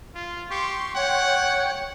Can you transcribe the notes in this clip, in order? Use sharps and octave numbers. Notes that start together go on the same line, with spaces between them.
F4
G4 C6 C#6
C#5 F#5 G5